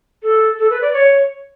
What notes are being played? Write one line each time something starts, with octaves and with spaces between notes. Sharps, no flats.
A4
A4
B4
D5
C#5